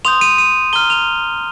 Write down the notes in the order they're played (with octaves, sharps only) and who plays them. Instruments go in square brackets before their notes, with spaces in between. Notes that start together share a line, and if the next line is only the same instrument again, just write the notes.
[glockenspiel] C6 D#6 G6 F7
D#7
D#7
A#5 F6 G7
F7